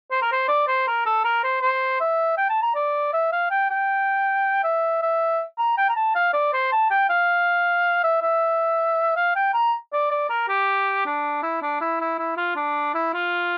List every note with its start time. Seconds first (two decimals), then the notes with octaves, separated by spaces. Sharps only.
0.11 C5
0.22 A#4
0.32 C5
0.48 D5
0.68 C5
0.87 A#4
1.06 A4
1.24 A#4
1.44 C5
1.62 C5
2.00 E5
2.37 G5
2.50 A5
2.62 A#5
2.75 D5
3.13 E5
3.32 F5
3.50 G5
3.70 G5
4.64 E5
5.02 E5
5.58 A#5
5.77 G5
5.89 A#5
5.95 A5
6.15 F5
6.33 D5
6.53 C5
6.72 A5
6.90 G5
7.09 F5
8.04 E5
8.22 E5
9.16 F5
9.35 G5
9.54 A#5
9.93 D5
10.11 D5
10.29 A#4
10.48 G4
11.06 D4
11.43 E4
11.62 D4
11.81 E4
12.00 E4
12.18 E4
12.37 F4
12.56 D4
12.94 E4
13.13 F4